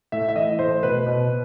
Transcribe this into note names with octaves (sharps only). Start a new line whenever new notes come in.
A2 E5
E5
E3 D#5
A2 C5
B2 B4
B2
B2